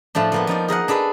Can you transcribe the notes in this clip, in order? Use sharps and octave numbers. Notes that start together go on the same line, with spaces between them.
A2 F3 A3 D4
F3 A#3 B3
F3 D#4 D5
G#4 A#4 D#5 F#5
D4 G#4 A4 B4